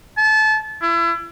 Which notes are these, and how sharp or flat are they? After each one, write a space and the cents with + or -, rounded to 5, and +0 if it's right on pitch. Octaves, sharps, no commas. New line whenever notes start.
A5 -25
E4 +35